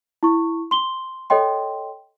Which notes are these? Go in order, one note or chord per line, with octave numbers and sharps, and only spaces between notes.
E4 C#6
C6 G7
A4 C#5 D#5 G5 C6